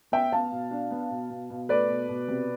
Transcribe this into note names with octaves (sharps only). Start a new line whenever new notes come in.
B3 E5 G5
B3 F5 A5
B2
D4
B3
B2
B2
B2
A3 B4 D5
B2
B2
C3